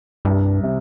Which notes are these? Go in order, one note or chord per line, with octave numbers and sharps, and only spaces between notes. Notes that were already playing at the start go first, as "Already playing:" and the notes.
C2 G2
C3